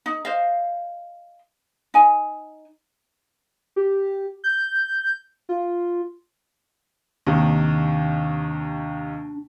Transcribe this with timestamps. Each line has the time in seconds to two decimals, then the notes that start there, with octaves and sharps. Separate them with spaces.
0.06 D#4
0.25 C5 D#5 F5
1.94 D#4 G#5
3.76 G4
4.44 G6
5.49 F4
7.27 D#2 C3 D#3 D4